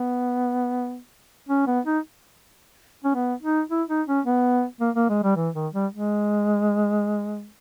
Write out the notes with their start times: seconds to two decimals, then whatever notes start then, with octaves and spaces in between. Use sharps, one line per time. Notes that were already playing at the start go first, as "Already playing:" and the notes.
Already playing: B3
1.49 C#4
1.67 B3
1.86 D#4
3.04 C#4
3.15 B3
3.42 D#4
3.70 E4
3.89 D#4
4.08 C#4
4.26 B3
4.81 A#3
4.96 A#3
5.09 G#3
5.23 G3
5.36 E3
5.55 D#3
5.74 G3
5.93 G#3